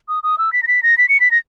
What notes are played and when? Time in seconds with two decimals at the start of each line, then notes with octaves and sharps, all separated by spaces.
0.08 D#6
0.23 D#6
0.38 E6
0.53 B6
0.63 A#6
0.67 B6
0.83 A#6
0.98 B6
1.09 C#7
1.20 B6
1.31 A#6